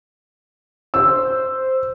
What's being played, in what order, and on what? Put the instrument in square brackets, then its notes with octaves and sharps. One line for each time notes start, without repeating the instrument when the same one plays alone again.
[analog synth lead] C5 [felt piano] E6